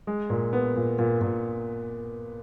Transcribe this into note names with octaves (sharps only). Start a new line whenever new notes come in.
G#3
A#2
B3
A#2
A#2
A#2